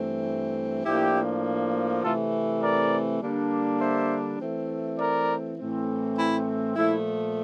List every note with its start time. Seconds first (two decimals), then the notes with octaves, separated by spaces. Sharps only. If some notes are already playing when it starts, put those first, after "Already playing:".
Already playing: G2 E3 A3 C4
0.84 A2 F3 A#3 D4 E4 G4
2.03 C3 E3 A3 C4 F4 A4
2.61 A#4 D5
3.21 D3 G3 A#3 D4
3.80 C5 E5
4.39 E3 A3 C4
4.98 A#4 D5
5.58 A2 E3 A3 C4
6.17 E4
6.76 A#2 F3 A3 E4